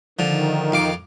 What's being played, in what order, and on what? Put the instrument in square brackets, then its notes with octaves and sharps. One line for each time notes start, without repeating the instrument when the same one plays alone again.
[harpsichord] D3 F3 [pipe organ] D#3
[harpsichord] F2 F5 D6